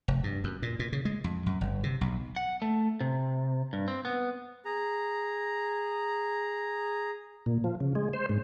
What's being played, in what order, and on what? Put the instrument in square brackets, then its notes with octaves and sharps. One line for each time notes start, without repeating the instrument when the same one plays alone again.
[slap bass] F1
G2
F#2
A#2
A#2
C#3
G#3
F2
F#2
G1
C3
B1
[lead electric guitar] F#5
A3
C3
G2
C4
B3
[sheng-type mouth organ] G#4 A#5
[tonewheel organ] A#2
F3
C#3
G#3
C5
G#2